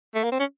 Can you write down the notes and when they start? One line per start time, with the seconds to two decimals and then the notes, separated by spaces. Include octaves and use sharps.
0.15 A3
0.24 A#3
0.32 C4
0.40 C#4